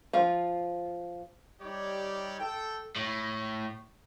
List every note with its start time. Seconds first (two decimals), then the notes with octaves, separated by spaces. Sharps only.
0.13 F3 F4
1.61 G3 D#4 G4 C#5 D5
2.40 A4 G5
2.96 A2